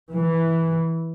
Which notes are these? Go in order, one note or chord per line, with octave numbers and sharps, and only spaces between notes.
E3